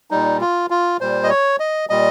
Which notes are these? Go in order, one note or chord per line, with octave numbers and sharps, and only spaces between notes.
A#2 G3 D#4
F4
F4
A#2 G3 C5
D#5
C#5
D#5
A#2 G3 D#5